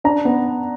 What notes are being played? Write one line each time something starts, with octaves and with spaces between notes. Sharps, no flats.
D4 A#5
B3